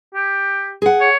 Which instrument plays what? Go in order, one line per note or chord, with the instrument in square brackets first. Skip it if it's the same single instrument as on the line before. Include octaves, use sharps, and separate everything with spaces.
[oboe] G4
[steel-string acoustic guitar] G#4 F#5
[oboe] C#5